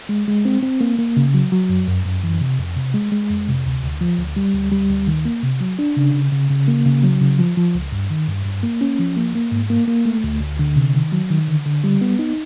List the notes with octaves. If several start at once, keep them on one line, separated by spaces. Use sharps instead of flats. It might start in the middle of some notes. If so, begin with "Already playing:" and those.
G#3
G#3
C4
C4
A#3
A#3
C#3
F#3
F#3
F#2
F#2
F#2
E3
C3
F2
C3
G#3
G#3
F2
C3
D2
D2
F3
D2
G3
D2
G3
D2
D#3
A#3
C3
F#3
D4
C#3
C#3
C#3
C#3
A#3
C#3
F#3
C#3
F3
F3
C#2
G2
D#3
G2
G2
A#3
C#4
F3
A#3
A#3
G#2
A#3
A#3
A3
D2
D2
D3
C3
D#3
F#3
D#3
D3
D3
G3
B3
D#4